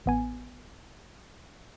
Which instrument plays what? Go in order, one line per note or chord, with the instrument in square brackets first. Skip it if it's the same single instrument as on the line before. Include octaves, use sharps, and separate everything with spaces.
[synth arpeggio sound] A1 B3 G#5